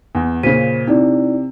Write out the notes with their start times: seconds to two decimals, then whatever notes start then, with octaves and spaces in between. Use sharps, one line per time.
0.15 E2 F#5 G#5
0.43 A#2 C#3 C5 B6 D#7
0.88 C3 D#4 E4 D5